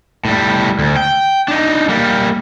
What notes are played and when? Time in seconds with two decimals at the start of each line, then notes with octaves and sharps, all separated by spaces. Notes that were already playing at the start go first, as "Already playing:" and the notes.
0.25 A2 G3
0.79 D2
0.96 G5
1.48 D4 D#4
1.89 G3 A#3